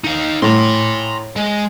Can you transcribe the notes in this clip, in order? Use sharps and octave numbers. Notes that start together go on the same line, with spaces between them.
D#4 F5
A2 A#5 C6
G#3